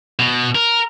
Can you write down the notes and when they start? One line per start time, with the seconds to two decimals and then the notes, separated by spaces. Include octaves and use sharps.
0.19 B2
0.55 A#4